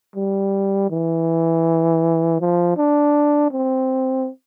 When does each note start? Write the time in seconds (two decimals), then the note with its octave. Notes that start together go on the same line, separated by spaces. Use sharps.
0.16 G3
0.90 E3
2.40 F3
2.77 D4
3.52 C4